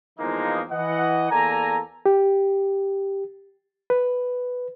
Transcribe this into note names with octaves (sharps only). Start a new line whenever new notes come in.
E2 E3 F3 G#3 A#3 D#4
E3 D#5 F#5
E2 A#3 A4 D5 G#5 A#5
G4
B4